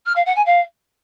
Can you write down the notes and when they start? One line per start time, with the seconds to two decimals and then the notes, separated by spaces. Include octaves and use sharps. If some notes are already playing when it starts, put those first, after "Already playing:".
0.05 F6
0.15 F5
0.25 F#5
0.35 G#5
0.45 F5